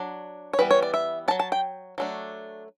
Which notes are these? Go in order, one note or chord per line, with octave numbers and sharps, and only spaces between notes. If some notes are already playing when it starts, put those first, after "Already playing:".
Already playing: F#3 D4
C#5
E3 G3 B3 B4
C#5
D5
E5
C#4 A5
F#3
A5
G5
F#3 A3 D4